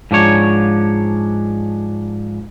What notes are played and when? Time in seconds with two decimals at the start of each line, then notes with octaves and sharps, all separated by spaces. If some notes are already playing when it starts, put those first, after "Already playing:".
0.11 G#2 F3 D4 C#5